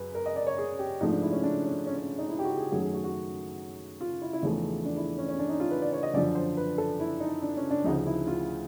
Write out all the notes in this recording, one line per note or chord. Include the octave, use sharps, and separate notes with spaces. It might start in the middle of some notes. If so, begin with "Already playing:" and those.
Already playing: F#2 C#3 B4
A#4
D#5
D5
C#5
G#4
G4
G#2 F3 A3 D#4
D4
E4
C#4
D4
C#4
C#4
C#4
D#4
E4
G4
F#4
G#4
F#2 D#3 F#3 A3 G#4
G#4
F#4
F#4
F4
E4
E4
E2 C#3 F3 A3 D#4
D4
E4
C#4
C#4
D4
D#4
F4
B4
D5
C#5
D#5
F#2 D3 F3 D5
C5
B4
A4
E4
D#4
D4
C#4
D4
D2 C#3 F3 D#4
E4
F4